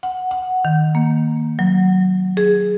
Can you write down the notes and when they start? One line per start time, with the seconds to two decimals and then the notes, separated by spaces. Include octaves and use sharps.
0.03 F#5
0.31 F#5
0.65 D#3
0.95 A#3
1.59 F#3
2.37 G#4